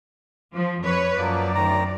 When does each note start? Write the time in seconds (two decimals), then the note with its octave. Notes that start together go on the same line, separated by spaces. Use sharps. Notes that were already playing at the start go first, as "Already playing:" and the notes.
0.54 F3
0.83 F2 B4 C#5
1.18 F#2 F3 F#3 A#3 D5
1.55 D2 D#3 A#5